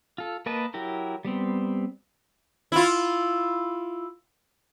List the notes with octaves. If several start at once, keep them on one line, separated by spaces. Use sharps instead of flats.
F4 A4
A#3 A#4 B4 D#5 A5
F#3 E4 G4 A#4
G3 B3 C4
E4 F4